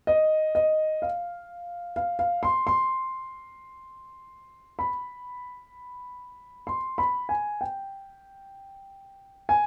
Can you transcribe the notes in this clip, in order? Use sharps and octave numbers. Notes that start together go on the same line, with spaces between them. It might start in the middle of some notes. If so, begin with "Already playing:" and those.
D#5
D#5
F5
F5
F5
C6
C6
B5
C6
B5
G#5
G5
G#5